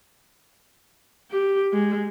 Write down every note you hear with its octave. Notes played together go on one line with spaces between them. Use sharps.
G4
G#3